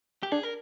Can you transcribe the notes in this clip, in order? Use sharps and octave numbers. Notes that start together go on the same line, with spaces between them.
G4
D4 G#4
A#4